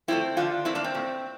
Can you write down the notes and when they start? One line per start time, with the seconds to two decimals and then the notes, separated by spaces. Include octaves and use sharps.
0.08 D3 F3 A3 C4 E4
0.37 D3 F3 A3 D4 F4
0.65 A#2 A3 C4 E4
0.75 A#3 D4
0.84 C4
0.94 A#2 A3